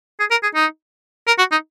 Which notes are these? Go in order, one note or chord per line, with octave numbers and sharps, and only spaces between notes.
G#4
A#4
G#4
D#4
A#4
F#4
D#4